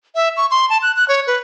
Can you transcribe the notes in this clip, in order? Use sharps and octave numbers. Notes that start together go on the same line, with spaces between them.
E5
C#6
C6
A5
F#6
F#6
C#5
B4